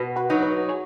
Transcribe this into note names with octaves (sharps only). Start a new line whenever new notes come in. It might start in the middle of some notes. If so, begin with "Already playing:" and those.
Already playing: B2 F#4 B4
F#4 B4
F#3 D#4
F#4 B4
G#4 C#5